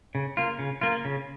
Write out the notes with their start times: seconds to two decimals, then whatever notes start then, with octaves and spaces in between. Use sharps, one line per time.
0.15 C#3
0.37 A#3 F4
0.59 C#3
0.81 A#3 F4
1.05 C#3